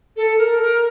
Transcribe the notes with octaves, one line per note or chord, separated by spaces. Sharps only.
A4
A#4
A4
A#4